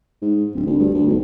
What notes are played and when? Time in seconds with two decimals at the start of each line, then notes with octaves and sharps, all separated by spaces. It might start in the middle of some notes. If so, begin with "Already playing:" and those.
0.22 G#2
0.54 D1
0.67 D2
0.79 G2
0.94 D2
1.07 B1